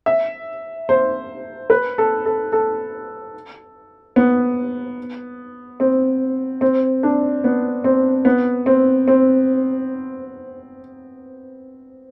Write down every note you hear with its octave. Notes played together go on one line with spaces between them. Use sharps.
E5
C5
B4
A4
A4
A4
B3
C4
C4
D4
B3
C4
B3
C4
C4